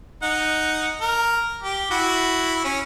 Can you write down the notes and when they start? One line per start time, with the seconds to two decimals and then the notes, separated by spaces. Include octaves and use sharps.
0.23 D#4 F#5
1.01 A#4
1.62 G4
1.91 E4 F#4
2.64 C#4